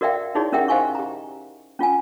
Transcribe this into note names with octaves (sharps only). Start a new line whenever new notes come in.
F#4 A#4 D5 E5 F5 G5
D#4 E4 F#4 G#4 C#5 D5
C#4 G4 A#4 E5 F#5 G5
C5 D#5 F5 G#5 C6 C#6
G4 A#5
C#4 F4 F#5 G#5